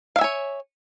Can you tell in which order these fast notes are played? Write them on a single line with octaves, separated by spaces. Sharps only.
F5 E5 G#5 C#5